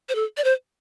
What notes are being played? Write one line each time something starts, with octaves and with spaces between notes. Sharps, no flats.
C5
A4
D5
C5